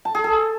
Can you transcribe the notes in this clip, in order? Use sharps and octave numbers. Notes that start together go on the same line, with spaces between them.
A5
G#4
A4